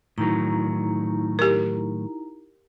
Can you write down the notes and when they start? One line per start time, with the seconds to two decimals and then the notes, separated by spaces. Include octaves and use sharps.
0.18 A2 D#3 F#3 D#4 E4 A#5
1.39 G4 A#4